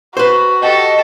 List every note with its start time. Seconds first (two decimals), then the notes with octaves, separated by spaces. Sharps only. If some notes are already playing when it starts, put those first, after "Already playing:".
0.17 F#4 B4 C5
0.62 G4 A4 D#5